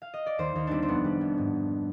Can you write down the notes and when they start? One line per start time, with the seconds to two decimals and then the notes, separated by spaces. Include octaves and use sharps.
0.02 F5
0.14 D#5
0.26 D5
0.38 D#2 C5
0.55 D#2 D#4
0.67 G3 C4 D4
0.83 C4
0.88 F1 B3
1.05 G3
1.21 F1
1.38 G#2
1.54 G#2